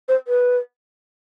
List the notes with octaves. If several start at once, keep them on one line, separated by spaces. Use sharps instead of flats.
C5
B4